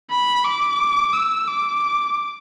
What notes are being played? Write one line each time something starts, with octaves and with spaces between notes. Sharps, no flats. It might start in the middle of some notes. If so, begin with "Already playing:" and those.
B5
D6
E6
D6